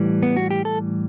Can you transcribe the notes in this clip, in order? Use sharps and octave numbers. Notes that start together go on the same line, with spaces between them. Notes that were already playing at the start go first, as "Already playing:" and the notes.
Already playing: A2 E3 G3
B3
F#4
G4
A4